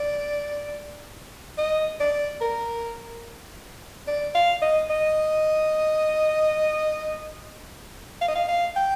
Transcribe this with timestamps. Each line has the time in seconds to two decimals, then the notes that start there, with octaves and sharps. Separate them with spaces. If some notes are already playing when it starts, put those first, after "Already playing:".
Already playing: D5
1.58 D#5
2.00 D5
2.41 A#4
4.07 D5
4.35 F5
4.62 D#5
4.90 D#5
8.21 F5
8.28 D#5
8.36 F5
8.48 F5
8.76 G5